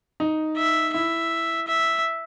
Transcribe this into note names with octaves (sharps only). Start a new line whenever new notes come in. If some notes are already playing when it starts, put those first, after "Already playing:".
D#4
E5
E4 E5
E5